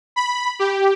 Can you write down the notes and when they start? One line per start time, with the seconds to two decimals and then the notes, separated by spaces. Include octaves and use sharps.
0.16 B5
0.59 G4